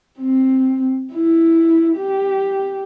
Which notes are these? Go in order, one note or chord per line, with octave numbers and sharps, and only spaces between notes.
C4
E4
G4